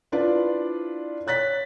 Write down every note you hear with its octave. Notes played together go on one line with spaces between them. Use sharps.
D4 E4 F4 B4 C5 D5
C#5 F#6 A6 B6